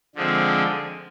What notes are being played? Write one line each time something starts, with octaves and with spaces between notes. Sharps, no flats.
D3 F3 G#3 C4